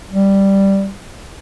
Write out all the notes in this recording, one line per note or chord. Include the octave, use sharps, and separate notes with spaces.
G3